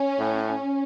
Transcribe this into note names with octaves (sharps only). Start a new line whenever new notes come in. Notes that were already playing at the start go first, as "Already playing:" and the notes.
Already playing: C#4
A2